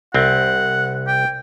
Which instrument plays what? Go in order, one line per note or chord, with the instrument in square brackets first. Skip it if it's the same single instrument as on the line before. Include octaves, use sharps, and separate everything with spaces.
[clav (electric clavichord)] C2 C4 [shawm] F#5
[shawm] G5